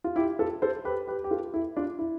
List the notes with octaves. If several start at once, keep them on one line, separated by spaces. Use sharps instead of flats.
F4
E4 G4
F4 A4
A4 C5
G4 B4
G4 B4
G4
F4 A4
E4
D4 F4
E4